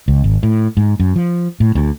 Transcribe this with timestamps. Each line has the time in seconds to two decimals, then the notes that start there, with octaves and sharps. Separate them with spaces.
0.08 C#2
0.24 G#1
0.43 A2
0.77 G#2
1.00 F#2
1.16 F3
1.60 A2
1.75 D2